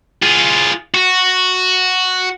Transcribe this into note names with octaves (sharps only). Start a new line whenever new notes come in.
F4 G#4
F#4